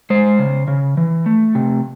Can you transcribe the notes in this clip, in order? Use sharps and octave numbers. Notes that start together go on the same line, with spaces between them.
G#3 C5
C#3
C#3
E3
A3
C3